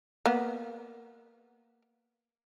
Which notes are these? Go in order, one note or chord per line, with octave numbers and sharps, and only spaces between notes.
A#3 B3